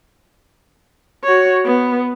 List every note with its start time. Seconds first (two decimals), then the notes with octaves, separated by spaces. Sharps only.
1.24 F#4 C#5
1.65 B3